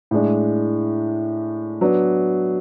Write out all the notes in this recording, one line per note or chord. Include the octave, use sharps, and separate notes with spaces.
A2 G#3 D4
F#3 B3 D4